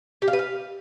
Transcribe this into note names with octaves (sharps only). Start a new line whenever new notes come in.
G4
F5
B4
F5